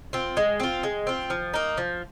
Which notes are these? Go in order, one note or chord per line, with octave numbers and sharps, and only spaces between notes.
C4 F4
G#3
C4 F4
G#3
C4 F4
F3
A#3 D#4
F3